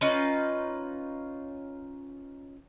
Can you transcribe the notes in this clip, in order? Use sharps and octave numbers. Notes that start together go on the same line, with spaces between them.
C#4 D#4 F4 B4